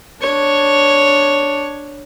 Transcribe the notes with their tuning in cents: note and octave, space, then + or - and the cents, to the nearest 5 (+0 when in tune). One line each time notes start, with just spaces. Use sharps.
D4 +0 C#5 +0